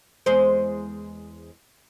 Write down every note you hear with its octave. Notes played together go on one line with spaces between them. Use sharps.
E2 G#3 C5